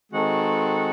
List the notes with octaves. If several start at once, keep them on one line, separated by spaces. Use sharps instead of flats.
D#3 G#3 C4 F#4 A4